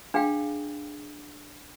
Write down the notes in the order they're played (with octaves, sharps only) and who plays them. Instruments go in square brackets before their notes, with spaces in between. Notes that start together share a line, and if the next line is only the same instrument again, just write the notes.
[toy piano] D4 G#4 F5 G5